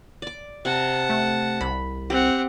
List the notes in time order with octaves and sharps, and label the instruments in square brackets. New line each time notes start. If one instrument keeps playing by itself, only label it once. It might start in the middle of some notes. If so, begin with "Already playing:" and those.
[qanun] D5 D6
[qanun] C3 [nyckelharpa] F#5 A5
[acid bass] A3
[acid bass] C2 [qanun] B5
[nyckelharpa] C4 F#5 [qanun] G4